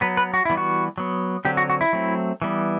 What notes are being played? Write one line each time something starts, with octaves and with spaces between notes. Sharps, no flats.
F#3 B3 B4
B4
F#4
E3 G3 B3 E4
F#4
F#3 B3
D3 F#3 C4 G4
F#4
F#4
E4
F#3 A3 C4
E3 G3 B3